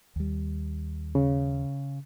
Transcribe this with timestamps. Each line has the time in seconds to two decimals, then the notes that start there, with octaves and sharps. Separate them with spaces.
0.16 D#2 G3
1.15 C#3